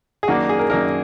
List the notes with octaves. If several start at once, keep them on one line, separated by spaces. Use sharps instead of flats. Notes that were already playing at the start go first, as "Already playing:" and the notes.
G#4
F#2 D#3 A#3 D4 F#4
G#4
A#4
F#2 D#3 A#3 D4 A#4